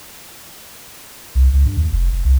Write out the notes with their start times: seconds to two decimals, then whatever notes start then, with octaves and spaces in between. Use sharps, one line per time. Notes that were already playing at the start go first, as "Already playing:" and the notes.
1.35 C2
1.53 C#2
1.66 G2
1.77 D#2
1.92 F1
2.12 F1
2.24 C2